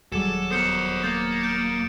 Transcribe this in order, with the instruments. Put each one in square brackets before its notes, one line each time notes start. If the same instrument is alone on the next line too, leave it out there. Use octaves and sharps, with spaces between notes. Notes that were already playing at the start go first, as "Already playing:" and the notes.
[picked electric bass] D#1 G3 [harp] F#3 G#4 [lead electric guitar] A4 [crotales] D6 E7
[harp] B3 A#4 [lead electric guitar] A4 C5 [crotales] D#6 G6 C#7
[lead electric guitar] A#3 [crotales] G6 A6
[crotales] G6 D7